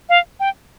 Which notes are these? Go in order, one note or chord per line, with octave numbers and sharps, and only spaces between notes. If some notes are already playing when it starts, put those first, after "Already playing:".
F5
G5